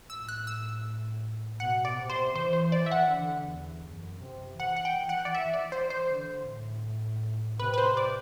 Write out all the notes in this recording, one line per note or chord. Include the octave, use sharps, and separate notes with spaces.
A2 E6
F#6
E6
B2 F#5
D5
C3
C5
E3 C5
C5
D5
E5
F#5
D3
E2
F#2
C3
E3 F#5
F#5
G5
F#5
D5
E5
D5
C5
C5
D3
A2
C3 B4
B4
C5
D5